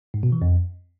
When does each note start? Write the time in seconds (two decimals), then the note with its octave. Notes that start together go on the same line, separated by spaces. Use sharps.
0.14 G#2
0.23 B2
0.32 E3
0.42 F2